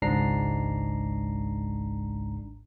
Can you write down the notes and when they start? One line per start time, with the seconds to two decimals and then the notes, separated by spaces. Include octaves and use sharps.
0.02 G#1 C#2 G#2 D4 A#5 C7